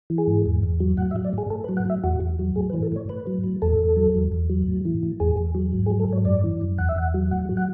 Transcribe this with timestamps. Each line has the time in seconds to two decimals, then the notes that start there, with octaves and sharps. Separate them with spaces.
0.10 E3
0.18 G#4
0.27 G#2
0.46 E2
0.63 E2
0.80 F#3
0.97 A2 F#5
1.11 E5
1.16 F#3
1.25 D5
1.33 A2 G#4
1.50 A2 A4
1.64 B4
1.69 F#3
1.77 F#5
1.85 A2 E5
2.04 E2 F#4
2.20 E2
2.39 F#3
2.56 A2 G#4
2.69 B4
2.73 E3
2.82 A4
2.92 A2 C#5
3.09 A2 B4
3.27 F#3
3.44 A2
3.62 E2 A4
3.79 E2
3.96 F#3
4.15 E2
4.32 E2
4.50 F#3
4.68 A2
4.85 E3
5.03 A2
5.20 E2 G#4
5.37 E2
5.55 F#3
5.73 G#2
5.86 G#4
5.90 F#3
6.00 A4
6.08 G#2 C#5
6.25 F#2 D5
6.44 E3
6.61 F#2
6.78 E2 F#5
6.89 E5
6.96 E2 F#5
7.14 F#3
7.31 A2 F#5
7.49 F#3
7.57 F#5